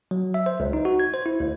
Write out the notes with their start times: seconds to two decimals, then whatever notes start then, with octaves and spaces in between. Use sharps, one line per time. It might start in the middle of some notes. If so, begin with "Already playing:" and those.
0.11 F#3
0.34 E5
0.46 C5
0.60 C#2
0.73 D#4
0.85 F#4
1.00 G#6
1.14 C5
1.26 E4
1.40 D2